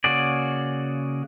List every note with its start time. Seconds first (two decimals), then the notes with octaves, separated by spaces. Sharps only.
0.04 C#3 A#3 F#4 G#4 D5